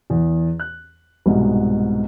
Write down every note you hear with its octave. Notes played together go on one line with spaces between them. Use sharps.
E2
F#6
C2 G#2 B2